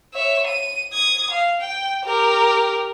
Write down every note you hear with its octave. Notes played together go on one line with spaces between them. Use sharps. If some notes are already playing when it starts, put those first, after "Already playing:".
C#5 E5
D#7
D#6 G#6
F5
G5
G4 A#4